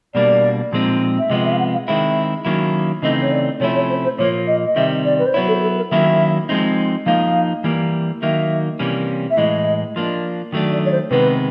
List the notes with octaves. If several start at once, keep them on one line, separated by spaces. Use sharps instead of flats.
B2 G3 A#3 D4 D5
A#2 F3 G#3 C4 D#4
E5
C3 F3 G#3 B3 D#5
E5
F5
F#5
F5
D#3 G#3 C4 E4 E5
D#3 F#3 A#3 C#4 E4
C#3 E3 A3 C4 D#4 D#5
C#5
D5
C3 F3 A3 C#4 E4 C#5
C#5
C5
C5
A#2 F3 A#3 C#5
D#5
D#5
C3 D#3 G3 C4 E5
D5
B4
C5
F#3 B3 E4 C#5
A4
A4
A#4
D#3 F#3 A#3 C#4 E4 E5
F3 G#3 C4 D#4
F3 A#3 D#4 F5
E3 G3 A#3
D#3 F#3 A#3 D#4 E5
C3 E3 G3 A#3 C#4
E5
A2 E3 G#3 D#5
F3 A#3 D4
D#3 F#3 A3 D4
D5
C#5
C5
C3 D#3 G#3 B3 B4